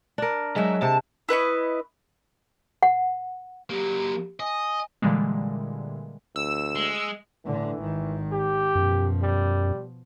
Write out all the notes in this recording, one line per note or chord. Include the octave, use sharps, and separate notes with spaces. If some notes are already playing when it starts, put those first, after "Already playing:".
D4 A#4
F#3 G#3 E5
C3 A5
E4 B4 D#5 C#6
F#5
F#3 A#3 G4
D#5 G#5
A#2 D3 E3 G3 G#3
D2 E6
G#3
A2 D3 E3
G#1 D#3
G4
F#2 B2 F3
G3